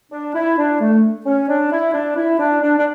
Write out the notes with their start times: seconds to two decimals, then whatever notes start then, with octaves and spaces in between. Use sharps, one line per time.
0.12 D4
0.35 E4
0.58 D4
0.81 A3
1.26 C#4
1.49 D4
1.71 E4
1.94 D4
2.16 E4
2.39 D4
2.62 D4
2.79 D4